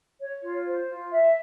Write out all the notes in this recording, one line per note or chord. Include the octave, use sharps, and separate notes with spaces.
C#5
F4
C5
F4
E5